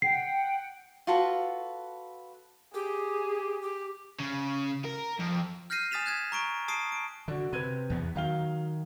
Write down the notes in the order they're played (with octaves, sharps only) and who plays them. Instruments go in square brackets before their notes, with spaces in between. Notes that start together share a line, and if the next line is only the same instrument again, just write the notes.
[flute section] F#5 G5 [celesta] C7
[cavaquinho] F4 F#4 A4 B4
[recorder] G4 [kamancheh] G#4
[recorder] G4
[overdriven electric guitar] C#3
A#4
F2
[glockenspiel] F6 G6 A#6 C7 D#7
G#5 D#6 A6 B6 E7 F7
F#6 G#6 E7
A#5 C#6 D7 G7
A5 D#6 C7 D7
D7
[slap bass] D3 [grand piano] F#4 D5
[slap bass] C3 [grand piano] B4 G#6 D#7
[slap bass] E2 B3
[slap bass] D#3 [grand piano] F#3 F5 G7